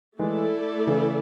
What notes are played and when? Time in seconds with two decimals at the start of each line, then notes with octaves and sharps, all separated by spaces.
0.19 E3 G#3 A3 E4 A4 D5
0.87 C#3 E3